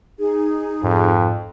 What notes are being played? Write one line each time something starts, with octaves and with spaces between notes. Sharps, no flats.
D#4 G#4
F2 G#2